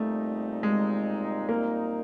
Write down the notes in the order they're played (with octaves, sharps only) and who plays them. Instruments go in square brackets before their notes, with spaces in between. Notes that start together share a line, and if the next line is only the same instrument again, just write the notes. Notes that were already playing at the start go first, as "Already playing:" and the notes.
Already playing: [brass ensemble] A#2 G3 C4 D#4 [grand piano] A3
[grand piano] G#3
A#3